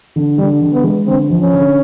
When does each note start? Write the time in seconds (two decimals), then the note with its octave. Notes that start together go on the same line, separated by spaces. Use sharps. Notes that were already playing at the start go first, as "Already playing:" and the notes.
0.16 D3
0.38 D3 G3
0.62 D3
0.73 B3
0.84 G#3
1.07 D3 C4
1.30 F3
1.41 C#4
1.53 D3